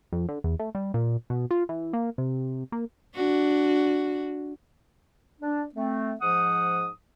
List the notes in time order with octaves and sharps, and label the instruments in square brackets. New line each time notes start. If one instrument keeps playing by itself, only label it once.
[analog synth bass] F2
D3
E2
A3
G3
A#2
B2
F4
E3
A#3
C3
A#3
[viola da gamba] D4 F#4
[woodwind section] D4
A3 C4
G#2 F3 F#5 D#6